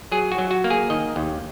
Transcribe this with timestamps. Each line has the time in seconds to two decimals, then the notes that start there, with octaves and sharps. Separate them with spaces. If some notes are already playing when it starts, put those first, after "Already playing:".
0.12 F#3 G#4
0.32 F#4
0.38 F#3
0.51 F#4
0.64 A#3
0.70 G#4
0.90 D#3 D#5
1.16 D#2